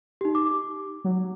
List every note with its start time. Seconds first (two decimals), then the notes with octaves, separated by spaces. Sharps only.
0.21 D#4 G4
0.35 D6
1.04 F#3